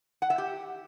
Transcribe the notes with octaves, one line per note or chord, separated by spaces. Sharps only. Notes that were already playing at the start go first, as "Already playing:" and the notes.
F#5
E5
G4